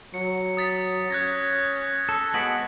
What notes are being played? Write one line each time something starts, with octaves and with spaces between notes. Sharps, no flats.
F#3 C#7
D#6 A6 B6
C#4 F#6 G#6 A#6
A4
G#3 B3 F#4 B6 D7 F#7